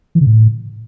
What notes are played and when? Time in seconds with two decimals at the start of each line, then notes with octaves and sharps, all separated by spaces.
0.15 E3
0.21 C#3
0.27 A2